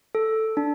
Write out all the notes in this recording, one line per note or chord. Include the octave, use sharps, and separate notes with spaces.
A4
D4